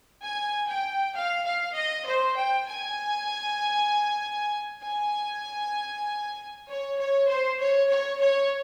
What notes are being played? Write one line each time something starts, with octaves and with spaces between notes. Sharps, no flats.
G#5
G5
F5
F5
D#5
C5
G5
G#5
G#5
C#5
C#5
C5
C#5
C#5
C#5